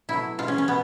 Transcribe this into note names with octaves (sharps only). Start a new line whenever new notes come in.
B2 F#3 A3 E4
B2 G#3 F4
C#4
C#4
B2 B3